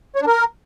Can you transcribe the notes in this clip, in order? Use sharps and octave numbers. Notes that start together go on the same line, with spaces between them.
C#5
D4
A#4